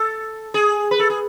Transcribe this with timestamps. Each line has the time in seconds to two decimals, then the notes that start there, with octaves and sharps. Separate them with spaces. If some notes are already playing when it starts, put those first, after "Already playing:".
Already playing: A4
0.54 G#4
0.91 B4
0.99 A4
1.10 G#4